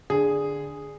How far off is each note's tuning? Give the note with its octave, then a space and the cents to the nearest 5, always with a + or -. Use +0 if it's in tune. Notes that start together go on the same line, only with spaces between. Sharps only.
D3 +0 G#4 -5